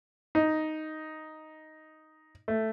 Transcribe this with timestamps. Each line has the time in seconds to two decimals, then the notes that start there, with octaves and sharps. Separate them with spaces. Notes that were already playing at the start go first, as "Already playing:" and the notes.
0.35 D#4
2.48 A3